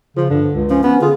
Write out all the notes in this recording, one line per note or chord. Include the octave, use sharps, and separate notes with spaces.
C#3 F3
G2 D3
C#2
F3 C#4
B3 C#4
D3 F4 G#4